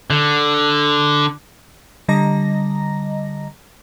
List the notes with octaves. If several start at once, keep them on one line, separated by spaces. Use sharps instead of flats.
D3
D3 G3 D#5 A#5 A#6